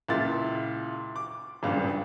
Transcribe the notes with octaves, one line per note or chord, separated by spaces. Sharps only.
C#2 A#2 E4 A6
D6
G#1 C#2 G2